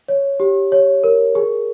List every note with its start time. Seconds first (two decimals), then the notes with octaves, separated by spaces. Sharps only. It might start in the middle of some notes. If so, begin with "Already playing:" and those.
0.08 C#5
0.40 G4
0.72 C#5
1.04 A#4
1.35 G#4